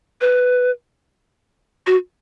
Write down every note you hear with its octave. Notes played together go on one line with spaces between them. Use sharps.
B4
F#4